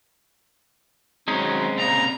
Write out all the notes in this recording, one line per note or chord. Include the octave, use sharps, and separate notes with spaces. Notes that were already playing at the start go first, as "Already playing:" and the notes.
D#3 F#3 G#3 C4 C#4
A#2 C#3 A#5